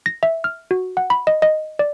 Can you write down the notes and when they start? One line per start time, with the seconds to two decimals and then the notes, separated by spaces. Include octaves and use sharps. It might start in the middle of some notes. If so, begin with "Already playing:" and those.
0.06 A#6
0.23 E5
0.44 F6
0.71 F#4
0.97 F#5
1.10 B5
1.27 D#5
1.42 D#5
1.79 D5